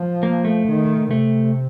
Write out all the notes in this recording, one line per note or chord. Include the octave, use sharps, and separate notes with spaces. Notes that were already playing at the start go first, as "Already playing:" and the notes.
Already playing: F3
A#3
A3
D#3
C3 A3